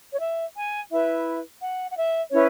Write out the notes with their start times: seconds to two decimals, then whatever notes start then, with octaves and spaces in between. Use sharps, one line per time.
0.12 C#5
0.21 E5
0.56 G#5
0.91 E4 B4 E5
1.61 F#5
1.91 F#5
1.97 E5
2.31 C#4 E4 B4 C#5